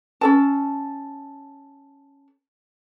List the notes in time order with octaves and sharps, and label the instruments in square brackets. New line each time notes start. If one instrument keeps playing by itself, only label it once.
[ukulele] C#4 A4 A5